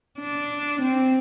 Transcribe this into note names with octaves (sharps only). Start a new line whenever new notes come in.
D4
C4